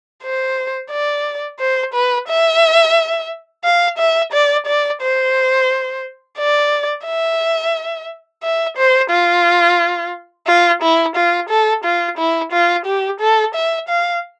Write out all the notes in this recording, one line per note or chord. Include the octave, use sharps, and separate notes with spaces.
C5
D5
C5
B4
E5
F5
E5
D5
D5
C5
D5
E5
E5
C5
F4
F4
E4
F4
A4
F4
E4
F4
G4
A4
E5
F5